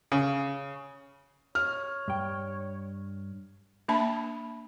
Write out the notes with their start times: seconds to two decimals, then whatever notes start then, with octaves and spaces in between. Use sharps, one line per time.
0.12 C#3
1.55 C#5 F6
2.08 G2 G5
3.88 A#3 D4 E5 A5 B5